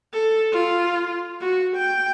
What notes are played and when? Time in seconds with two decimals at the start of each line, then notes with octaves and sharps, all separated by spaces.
0.12 A4
0.52 F4
1.40 F#4
1.76 G5